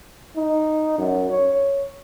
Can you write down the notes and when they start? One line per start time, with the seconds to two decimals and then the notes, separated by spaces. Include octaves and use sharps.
0.36 D#4
0.98 F#2
1.30 C#5